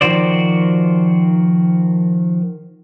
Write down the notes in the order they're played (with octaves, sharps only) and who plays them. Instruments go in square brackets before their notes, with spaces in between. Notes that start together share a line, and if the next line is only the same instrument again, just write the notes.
[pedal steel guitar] D#3 F3 F#4 C5 D5